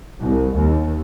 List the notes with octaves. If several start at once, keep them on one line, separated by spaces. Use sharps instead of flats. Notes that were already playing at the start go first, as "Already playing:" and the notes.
C2
D#2